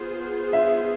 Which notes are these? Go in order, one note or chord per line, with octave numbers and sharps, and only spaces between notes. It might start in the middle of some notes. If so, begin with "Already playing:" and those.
Already playing: B3 F4 G#4 C5
E5